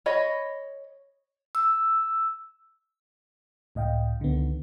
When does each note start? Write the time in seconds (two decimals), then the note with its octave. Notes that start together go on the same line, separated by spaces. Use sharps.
0.06 C#5 D#5 B5
1.55 E6
3.75 C#2 A2 D#5 F5 G5
4.20 C#2 D3 D#3 B3